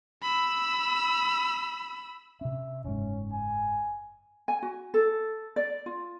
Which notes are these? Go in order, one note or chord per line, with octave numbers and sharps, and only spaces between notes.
B5 E6
C3 C#4 E5
F#1 G#2 C#4
G#5
G#5
F#4
A4
D5
F4